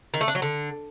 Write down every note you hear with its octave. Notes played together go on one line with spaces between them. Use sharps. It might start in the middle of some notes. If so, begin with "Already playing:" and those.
D#3
A3
D4
F#3
D3